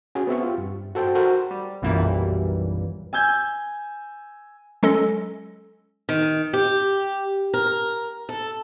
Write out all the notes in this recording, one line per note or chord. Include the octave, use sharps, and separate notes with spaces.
C#4 F#4 G#4
B3 C4 E5 C#6
F4 G4
G2
F#4 A4 C5 G5
F#4 A#4 C5
G3
B1 F#2 A#2 E3 G3 A#3
G#5 E6 G6 G#6
F#3 G#3 C#4 A4 D#5 E6
D#3
G4
A#4
A4